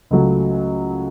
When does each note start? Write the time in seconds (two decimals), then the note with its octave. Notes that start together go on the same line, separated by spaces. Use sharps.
0.11 C#2 C#3 F#3 A3